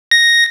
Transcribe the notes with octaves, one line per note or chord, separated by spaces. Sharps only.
A#6